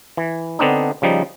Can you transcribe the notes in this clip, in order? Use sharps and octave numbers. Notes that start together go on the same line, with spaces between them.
E3
D3 B3 C4 D4 D#4
C#3 F3 G3 D#4